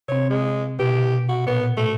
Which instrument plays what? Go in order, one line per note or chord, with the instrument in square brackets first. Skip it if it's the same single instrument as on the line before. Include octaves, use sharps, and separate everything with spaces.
[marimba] C3 C4 [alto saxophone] C#5
[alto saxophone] G#3
[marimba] B2 [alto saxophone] G4
[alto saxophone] F#4
[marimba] A#2 [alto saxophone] B3
[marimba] A2 [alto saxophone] A3